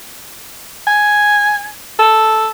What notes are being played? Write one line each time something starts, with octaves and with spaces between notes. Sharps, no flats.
G#5
A4